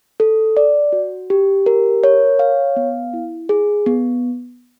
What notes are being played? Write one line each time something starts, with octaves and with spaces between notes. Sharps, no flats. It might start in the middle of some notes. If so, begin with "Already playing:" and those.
A4
D5
F#4
G4
A#4
C#5
F5
B3
E4
G#4
B3